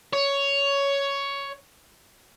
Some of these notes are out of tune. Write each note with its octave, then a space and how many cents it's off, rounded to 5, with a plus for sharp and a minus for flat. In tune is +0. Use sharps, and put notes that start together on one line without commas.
C#5 +10